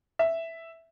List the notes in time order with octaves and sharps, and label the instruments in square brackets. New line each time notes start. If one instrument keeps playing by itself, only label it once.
[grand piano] E5